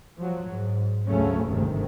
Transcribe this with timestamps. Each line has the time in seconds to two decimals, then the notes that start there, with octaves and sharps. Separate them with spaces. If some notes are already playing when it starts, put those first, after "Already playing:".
0.20 F3 F#3
0.50 G#2
1.08 D2 C#3 F#3 A3 C#4
1.45 G1 D2 G#2 C3 D#3